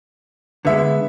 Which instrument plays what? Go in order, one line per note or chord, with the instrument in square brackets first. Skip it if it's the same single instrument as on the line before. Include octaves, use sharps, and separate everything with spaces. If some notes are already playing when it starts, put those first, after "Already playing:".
[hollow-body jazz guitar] D3 G#3 [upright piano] B3 E5